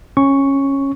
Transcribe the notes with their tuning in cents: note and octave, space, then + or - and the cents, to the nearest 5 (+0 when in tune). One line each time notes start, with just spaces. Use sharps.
C#4 -15 C#6 +0